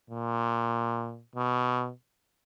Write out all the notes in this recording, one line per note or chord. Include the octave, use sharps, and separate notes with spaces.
A#2
B2